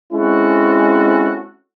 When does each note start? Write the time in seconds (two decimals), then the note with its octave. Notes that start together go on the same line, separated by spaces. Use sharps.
0.13 G#3 C4 C#4 E4 F#4 A4